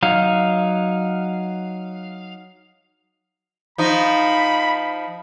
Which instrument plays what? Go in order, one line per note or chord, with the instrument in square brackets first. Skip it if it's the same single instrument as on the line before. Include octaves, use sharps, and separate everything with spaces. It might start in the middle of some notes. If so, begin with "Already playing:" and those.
[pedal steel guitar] F#3 D#4 F5
[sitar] F3 D#4 [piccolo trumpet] B5